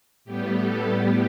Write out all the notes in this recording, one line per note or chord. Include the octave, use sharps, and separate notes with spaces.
A2 G3 B3 G4
A4
A2 G3 B3 G4